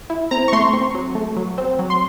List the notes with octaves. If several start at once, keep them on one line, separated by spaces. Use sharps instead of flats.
E4
C4 A#5
C#6
A3 C6
C4
F#3
A3
F#3
C4
F#3
C6